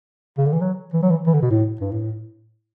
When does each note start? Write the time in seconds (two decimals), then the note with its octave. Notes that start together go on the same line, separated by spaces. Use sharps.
0.38 C#3
0.46 D3
0.53 E3
0.61 F#3
0.93 E3
1.03 F#3
1.11 E3
1.26 E3
1.34 D3
1.42 B2
1.51 A2
1.81 G2
1.91 A2